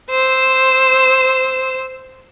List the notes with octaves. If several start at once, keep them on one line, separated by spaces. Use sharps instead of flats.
C5 E6